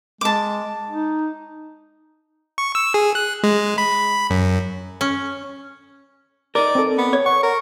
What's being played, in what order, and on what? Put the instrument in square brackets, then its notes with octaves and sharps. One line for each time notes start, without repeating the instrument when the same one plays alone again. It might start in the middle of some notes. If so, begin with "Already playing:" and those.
[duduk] G#3 [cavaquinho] A5 D6
[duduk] D#4
[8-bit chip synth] C#6
E6
G#4
F#6
G#3
B5
F#2
[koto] C#4
[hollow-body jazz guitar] D#4 A#4 [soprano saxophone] D5
[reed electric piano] C4 A4
[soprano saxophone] B3
[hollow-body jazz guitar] C#5
[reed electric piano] F#5 [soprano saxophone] C#6
[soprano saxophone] A#4